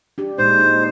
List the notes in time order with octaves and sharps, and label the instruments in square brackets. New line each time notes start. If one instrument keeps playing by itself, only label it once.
[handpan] D4 G4
[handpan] A#2 G#3 D#4 [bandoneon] C5
[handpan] D#4